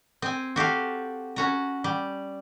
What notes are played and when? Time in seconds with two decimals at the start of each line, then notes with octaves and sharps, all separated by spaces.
0.22 C4 G#5
0.56 F#4 G4 A4 F5
1.36 C#4 F#4 A#5
1.84 G3